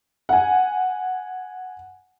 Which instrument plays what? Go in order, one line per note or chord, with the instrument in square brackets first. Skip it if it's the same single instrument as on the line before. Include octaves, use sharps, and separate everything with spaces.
[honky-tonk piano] F#5 G#5